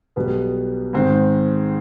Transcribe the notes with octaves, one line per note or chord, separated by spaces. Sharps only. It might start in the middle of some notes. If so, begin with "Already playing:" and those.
B1 B2 G3 B3
G#2 D#3 G#3 C4